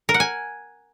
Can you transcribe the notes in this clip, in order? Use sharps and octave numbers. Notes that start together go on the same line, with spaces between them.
A#4
F#5
G#5